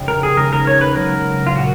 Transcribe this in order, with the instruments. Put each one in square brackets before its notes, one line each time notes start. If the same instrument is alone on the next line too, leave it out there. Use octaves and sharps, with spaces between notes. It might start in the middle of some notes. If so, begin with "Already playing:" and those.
Already playing: [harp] F1 F2 C#3 F3
[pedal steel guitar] A#4
G#4
[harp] D#2 C#3 G#3 C#4 G#4 [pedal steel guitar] A#4
[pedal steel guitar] A#4
C#5
B4
[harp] C#3 F#3 A#3 [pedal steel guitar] A#4
[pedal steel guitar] F4
[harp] A#2 F3 [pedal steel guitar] F#4